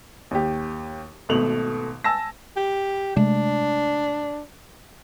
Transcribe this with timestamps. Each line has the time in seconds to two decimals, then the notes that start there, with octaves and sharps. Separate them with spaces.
0.31 D#2 G4
1.29 G#1 B2 A3 F7 F#7
2.04 G#5 A5 E6 A#6
2.57 G4
3.16 C3 G#3 A3 D4